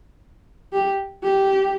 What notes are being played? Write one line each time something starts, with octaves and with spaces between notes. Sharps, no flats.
G4
G4